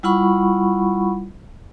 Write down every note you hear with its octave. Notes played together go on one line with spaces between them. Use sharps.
G3 E4 F4 F#5 B5 C#6